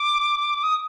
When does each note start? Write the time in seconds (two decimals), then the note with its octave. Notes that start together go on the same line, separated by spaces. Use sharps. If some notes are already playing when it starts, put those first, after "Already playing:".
Already playing: D6
0.63 D#6